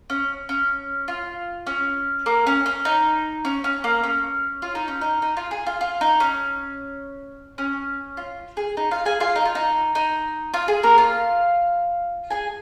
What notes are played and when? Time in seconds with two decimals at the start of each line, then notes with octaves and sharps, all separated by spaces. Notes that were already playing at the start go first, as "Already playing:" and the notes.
0.10 C#4
0.49 C#4
1.08 F4
1.67 C#4
2.26 A#3
2.47 C#4
2.66 C#4
2.85 D#4
3.45 C#4
3.64 C#4
3.84 A#3
4.04 C#4
4.62 F4
4.75 D#4
4.88 C#4
5.01 D#4
5.22 D#4
5.37 F4
5.51 G#4
5.66 F4
5.81 F4
6.01 D#4
6.20 C#4
7.58 C#4
8.17 F4
8.57 G#4
8.77 D#4
8.91 F4 F5
9.05 G#4 G#5
9.20 F4 F5
9.36 D#4
9.45 F4
9.55 D#4
9.95 D#4
10.54 F4
10.68 G#4
10.83 A#3 A#4
10.98 F4 F5
12.31 G#4 G#5